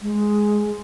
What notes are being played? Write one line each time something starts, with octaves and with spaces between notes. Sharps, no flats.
G#3